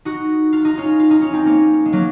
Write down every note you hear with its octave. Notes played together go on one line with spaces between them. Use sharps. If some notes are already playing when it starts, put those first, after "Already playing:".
D#4 F#4
F4
D#4
C#4 F4
F4
D#4
C#4
C4 D#4
A#3 C#4
G#3
F#3 A#3